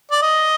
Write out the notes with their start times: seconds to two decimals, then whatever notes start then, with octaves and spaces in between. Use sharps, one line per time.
0.12 D5
0.22 D#5